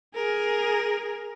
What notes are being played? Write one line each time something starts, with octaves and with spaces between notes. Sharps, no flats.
G#4 A#4